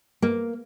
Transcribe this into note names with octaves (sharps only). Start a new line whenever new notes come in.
A#3